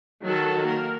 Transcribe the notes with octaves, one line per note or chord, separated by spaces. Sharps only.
D#3 F#3 F#4 A4
A#3 A#4